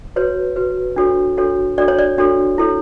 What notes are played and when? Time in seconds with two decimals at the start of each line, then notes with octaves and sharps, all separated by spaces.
0.16 F#4 B4 C#5
0.56 F#4 B4
0.96 D4 F#4 A4 C#5
1.37 D4 F#4 A4 C#5
1.78 D4 F#4 A4 C#5 D5
1.88 C#5
1.99 D5
2.18 D4 F#4 A4 C#5
2.58 E4 A4 C#5